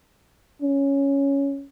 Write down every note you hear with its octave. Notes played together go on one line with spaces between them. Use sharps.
C#4